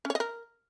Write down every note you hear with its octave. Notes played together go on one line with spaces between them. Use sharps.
C#4
C#5
D#5
A#4